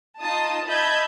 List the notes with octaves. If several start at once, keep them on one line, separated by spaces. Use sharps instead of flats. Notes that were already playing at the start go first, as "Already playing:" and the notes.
D#4 F4 A5 D#6
D#5 E5 A5 B5 G6 G#6